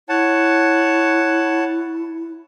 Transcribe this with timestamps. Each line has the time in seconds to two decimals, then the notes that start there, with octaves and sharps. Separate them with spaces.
0.09 E4 C#5 F#5 A5